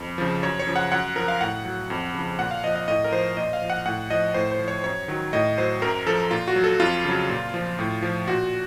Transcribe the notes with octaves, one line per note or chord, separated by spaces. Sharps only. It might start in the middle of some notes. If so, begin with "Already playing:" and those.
Already playing: F2
C#3 F3
F#2 C#5
C#5
C#3 F3
F#5
F#2 F#5
F3 A#4
F5
A2 F#5
F#3
F2
C#3 F3
A#2 F#5
F5
F3 D#5
D#5
A2 D#5
A#4
F3 C5
A#2 D#5
F5
F3
F#5
A2 F#5
F3 D#5
A2 C5
C5
F3
C#5
F#2 C#5
D#3 F#3
A2 D#5
F#3 C5
F#2 A#4
F3 A4
A#2 F4
F#4
F#3
A4
F2 F4
C#3 F#3
A#2
F3
A2
F3
A#2 F#4